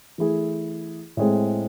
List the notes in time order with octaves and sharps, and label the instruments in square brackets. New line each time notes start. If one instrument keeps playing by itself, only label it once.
[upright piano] E3 A3 E4 G#4
A2 G#3 C4